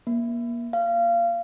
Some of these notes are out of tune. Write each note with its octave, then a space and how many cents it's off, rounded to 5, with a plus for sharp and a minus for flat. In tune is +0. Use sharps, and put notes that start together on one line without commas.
A#3 +30
F5 -25